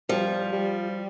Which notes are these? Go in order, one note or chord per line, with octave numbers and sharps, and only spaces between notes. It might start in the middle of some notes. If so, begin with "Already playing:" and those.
F3 G3
G3